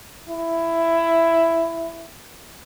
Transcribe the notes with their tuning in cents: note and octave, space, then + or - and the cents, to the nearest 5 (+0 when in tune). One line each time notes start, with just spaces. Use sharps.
E4 +10